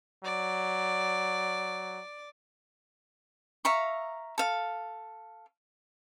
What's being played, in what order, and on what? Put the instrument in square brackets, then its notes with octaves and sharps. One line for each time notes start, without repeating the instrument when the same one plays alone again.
[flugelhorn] F#3 [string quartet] D5
[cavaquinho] E5 F5 A#5 C#6
A4 F5